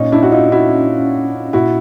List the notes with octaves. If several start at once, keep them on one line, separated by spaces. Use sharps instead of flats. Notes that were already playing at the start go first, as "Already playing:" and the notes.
Already playing: A#2 C#4 D#4
D4 E4
F#4
D#4 F4
E4 F#4
A#2 E4 F#4